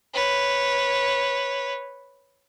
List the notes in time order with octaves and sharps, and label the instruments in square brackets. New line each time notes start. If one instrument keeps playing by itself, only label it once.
[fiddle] B4 C#5